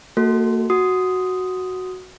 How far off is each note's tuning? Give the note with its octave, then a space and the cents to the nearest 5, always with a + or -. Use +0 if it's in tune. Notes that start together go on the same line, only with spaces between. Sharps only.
A#3 -40 F#4 +0 A4 +0
F#4 +0 D#6 +0